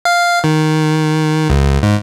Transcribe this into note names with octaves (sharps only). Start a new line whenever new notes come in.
F5
D#3
C#2
G#2